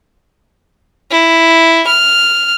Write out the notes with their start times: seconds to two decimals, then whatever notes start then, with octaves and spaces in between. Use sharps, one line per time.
1.11 E4
1.87 F6